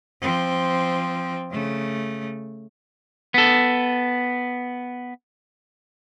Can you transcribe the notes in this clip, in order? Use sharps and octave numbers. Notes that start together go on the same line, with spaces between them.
F3 C4
C#3 A3
B3 A4